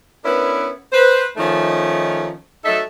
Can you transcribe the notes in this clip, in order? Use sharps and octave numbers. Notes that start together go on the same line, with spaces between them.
B3 C#4 D4 E4 A#4 B4
B4 C5
D#3 F3 A3 C#4 D#4
F#3 A3 D#4 A4 E5